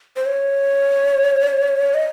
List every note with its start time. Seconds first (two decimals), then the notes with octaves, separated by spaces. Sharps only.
0.16 C5
0.26 C#5
1.94 D#5